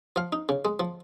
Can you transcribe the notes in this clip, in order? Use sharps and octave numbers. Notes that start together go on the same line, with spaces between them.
F3 F5
D#4
C#3
G#3
F3